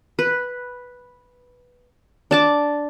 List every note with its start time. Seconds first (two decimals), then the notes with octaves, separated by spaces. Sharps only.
0.19 B4
2.31 D4 A5 D6